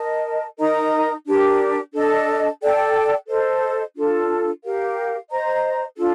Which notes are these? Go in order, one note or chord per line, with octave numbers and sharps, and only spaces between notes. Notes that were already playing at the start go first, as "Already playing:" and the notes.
Already playing: A#4 D#5 A5
D#4 A#4 D#5 A#5
D4 G4 A#4
D4 A4 D#5 A5
A4 D5 G5
A4 C5 D#5
D4 F4 A4
G4 A#4 F5
C5 D#5 A#5
D4 F4 A4